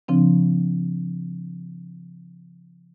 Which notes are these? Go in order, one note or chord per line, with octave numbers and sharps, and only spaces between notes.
C#3 F3 C4 D4